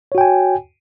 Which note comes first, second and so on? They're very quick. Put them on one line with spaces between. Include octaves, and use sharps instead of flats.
C#5 F#4 G5 G#5